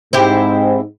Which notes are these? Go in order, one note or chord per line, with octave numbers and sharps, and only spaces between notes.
G#2 C4 E4 G4